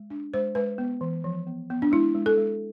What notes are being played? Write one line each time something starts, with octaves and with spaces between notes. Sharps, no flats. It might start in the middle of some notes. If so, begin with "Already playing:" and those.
Already playing: G#3
D4
G#3 C5
G#3 B4
B3
E3
F3
B3
B3
D4
G#3 E4
G#3
A4
G#3